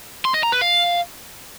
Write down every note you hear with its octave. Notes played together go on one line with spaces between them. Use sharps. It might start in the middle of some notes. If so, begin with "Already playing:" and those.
C6
D#5
A#5
B4
F5